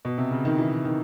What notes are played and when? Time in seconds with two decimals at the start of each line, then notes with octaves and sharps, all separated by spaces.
0.05 B2
0.18 C3
0.31 C#3
0.45 D#3
0.58 E3
0.85 D#3